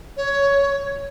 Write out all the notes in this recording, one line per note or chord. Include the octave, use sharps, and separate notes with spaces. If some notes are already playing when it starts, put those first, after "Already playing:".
C#5